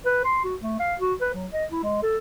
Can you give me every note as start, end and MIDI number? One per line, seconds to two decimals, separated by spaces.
0.06 0.21 71
0.25 0.40 84
0.44 0.55 66
0.62 0.75 57
0.80 0.95 77
1.00 1.14 66
1.21 1.30 71
1.34 1.47 54
1.53 1.65 75
1.72 1.84 64
1.84 1.99 56
2.03 2.18 69